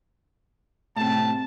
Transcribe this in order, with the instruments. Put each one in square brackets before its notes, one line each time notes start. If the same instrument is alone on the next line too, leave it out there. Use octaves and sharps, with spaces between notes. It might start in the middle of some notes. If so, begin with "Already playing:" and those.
[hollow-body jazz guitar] A2 C3 [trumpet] A5